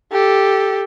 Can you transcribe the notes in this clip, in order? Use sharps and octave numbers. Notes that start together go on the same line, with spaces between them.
G4 A4